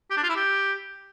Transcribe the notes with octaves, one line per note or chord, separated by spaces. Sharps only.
G4
D4
F4
E4
G4